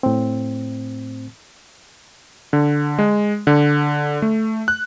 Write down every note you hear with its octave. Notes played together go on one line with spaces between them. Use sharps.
A2 C4
D3
G#3
D3
A3
F#6